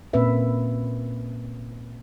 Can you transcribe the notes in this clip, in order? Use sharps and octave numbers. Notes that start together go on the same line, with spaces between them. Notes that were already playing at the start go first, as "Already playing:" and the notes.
A#2 A#3 C4 C#4 B4 E5